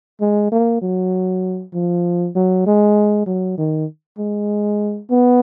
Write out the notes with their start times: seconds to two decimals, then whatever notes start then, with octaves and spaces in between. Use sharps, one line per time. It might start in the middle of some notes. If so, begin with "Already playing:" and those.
0.21 G#3
0.52 A#3
0.82 F#3
1.74 F3
2.36 F#3
2.67 G#3
3.26 F#3
3.58 D#3
4.18 G#3
5.11 B3